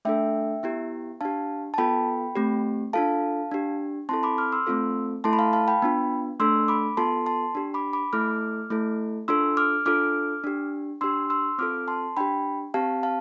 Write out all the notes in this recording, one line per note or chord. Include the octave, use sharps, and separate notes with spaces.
A3 D4 A4 E5 G5
B3 E4 G4
D4 G4 F5 A5
A5
B3 F4 A4 G5 B5
A3 C4 G4
D4 F4 A4 F5 A5
D4 G4
C4 E4 A4 A5 C6
B5 D6
D6 F6
C6 E6
A3 C4 F4 A4
A3 E4 A4 A5 C6
B5
F5 A5
F5 A5
G5 B5
B3 D4 F4
A3 D4 A4 C6 E6
B5 D6
B3 F4 A4 A5 C6
A5 C6
D4 G4
B5 D6
B5 D6
A3 E4 A4 D6 F6
A3 E4 A4
D4 F4 A4 C6 E6
D6 F6
D4 F4 A4 D6 F6
D4 G4
D4 G4 C6 E6
C6 E6
C4 F4 A4 D6 F6
A5 C6
D4 G4 G5 B5
C4 G4 F5 A5
F5 A5